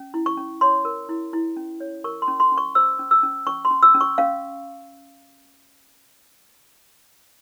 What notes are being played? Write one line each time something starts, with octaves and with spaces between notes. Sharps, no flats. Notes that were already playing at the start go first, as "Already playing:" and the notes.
Already playing: C#4
E4
C#6
C#4
C#5 C6
A#4
E4
E4
C#4
C#5
A#4 C#6
C6
C#4
C6
C#4
C#6
C5 E6
C#4
E6
C#4
C#4 C#6
C6
C#4
E6
C#4
C#6
C#4 F5